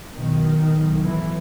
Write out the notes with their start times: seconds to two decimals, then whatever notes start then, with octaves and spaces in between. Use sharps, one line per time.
0.15 B1 B2 D#3
0.74 B1 A2
1.03 E3